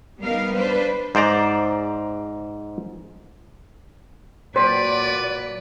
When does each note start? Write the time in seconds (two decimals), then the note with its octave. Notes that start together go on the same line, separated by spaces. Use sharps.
0.21 G3 B3 D#4 A#4 F5
0.55 D4 B4 C5
1.15 G#2 C5 D5 A#5
4.56 A#2 F#3 B4 C5 D5